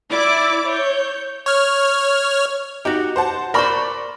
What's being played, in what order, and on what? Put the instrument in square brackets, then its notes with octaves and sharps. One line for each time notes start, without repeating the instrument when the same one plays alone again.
[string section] E4 D5 D6
C#5 G6
[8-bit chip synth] C#5 F6
[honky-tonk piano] D#4 [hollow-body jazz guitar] F#4 G4
[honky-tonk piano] C5 F#5 A5
[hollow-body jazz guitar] A#4 C5 [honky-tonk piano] D5 B5 C#6